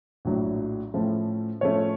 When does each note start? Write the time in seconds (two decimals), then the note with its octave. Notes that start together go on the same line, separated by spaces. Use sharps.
0.25 A#1 A2 F#3
0.94 A2 F3 A3 C#4
1.61 A2 F3 A3 C#4 C#5